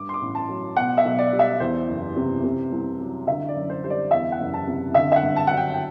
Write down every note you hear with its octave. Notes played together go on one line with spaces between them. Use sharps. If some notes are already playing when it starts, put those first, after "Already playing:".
Already playing: G2 D6
C6
D6
A1
A5
F#3
B2 F#5
E5
B1
D5
G3
E5
E2 C5
F#1
C3
C3
C2
F#3
D3 E5
D5
F#2
C5
G3 C5
D5
E2 E5
F#5
F#1
A5
C3
D3 E5
E5
F#5
G2
A5
F#3 F#5
G5
G5